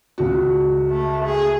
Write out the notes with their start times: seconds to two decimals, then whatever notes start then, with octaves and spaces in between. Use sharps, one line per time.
0.18 C#2 F#4
0.90 A3
1.25 G#4